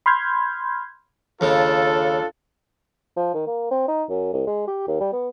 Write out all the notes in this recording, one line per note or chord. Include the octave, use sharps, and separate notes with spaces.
B5 C6 F6 G6 G#6
D#2 C#3 D4 F4 A4
F3
D#3
A#3
C4
D#4
F#2
C2
G#3
G4
D#2
G3
B3